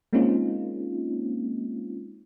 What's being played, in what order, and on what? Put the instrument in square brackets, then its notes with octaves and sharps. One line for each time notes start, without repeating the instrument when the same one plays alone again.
[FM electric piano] G#3 A#3 C4 C#4 D#4 F4